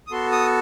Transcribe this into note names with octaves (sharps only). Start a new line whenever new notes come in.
D#6
B3 F#4 A4 C6
D#6